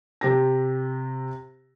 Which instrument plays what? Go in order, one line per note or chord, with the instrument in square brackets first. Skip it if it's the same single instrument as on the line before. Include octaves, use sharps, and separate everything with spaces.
[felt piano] C3 G4 A#6